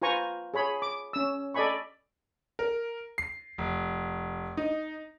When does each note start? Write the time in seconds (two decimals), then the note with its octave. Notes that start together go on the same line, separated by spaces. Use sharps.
0.02 F4 B4 C5 G#5 A#5 C#6
0.54 G#4 C#5 B5 C6
0.82 D6
1.13 C#4 E6
1.54 A4 D5 D#5 G#5 B5 C#6
2.59 A#4
3.18 C7
3.58 F1
4.57 D#4